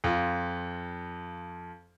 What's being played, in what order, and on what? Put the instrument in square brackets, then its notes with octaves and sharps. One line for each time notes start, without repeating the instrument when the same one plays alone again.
[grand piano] F2 F4